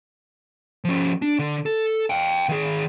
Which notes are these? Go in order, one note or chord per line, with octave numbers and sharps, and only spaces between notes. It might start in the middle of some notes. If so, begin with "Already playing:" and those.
F3 C#4
D4
D3
A4
F5 G5
D#3 G#4